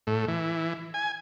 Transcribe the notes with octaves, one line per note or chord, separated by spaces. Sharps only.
A2
E3
G#5